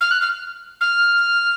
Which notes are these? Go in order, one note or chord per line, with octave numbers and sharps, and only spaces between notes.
F6
F#6
F6
F6